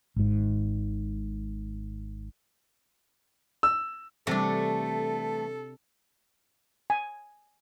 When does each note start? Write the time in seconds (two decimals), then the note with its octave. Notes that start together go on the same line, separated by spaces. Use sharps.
0.16 G#1 G#2
3.63 E6
4.27 C3 E3 G3 A3 D4 A4 G5
6.90 G#5